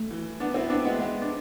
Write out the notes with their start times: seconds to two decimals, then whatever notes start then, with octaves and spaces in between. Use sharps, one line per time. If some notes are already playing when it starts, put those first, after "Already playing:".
Already playing: A3
0.11 E3
0.40 B3 D4
0.54 C4 E4
0.70 B3 D4
0.85 G#3 B3
0.99 G#3 B3
1.22 D4